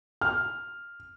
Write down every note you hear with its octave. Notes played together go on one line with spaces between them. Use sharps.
F6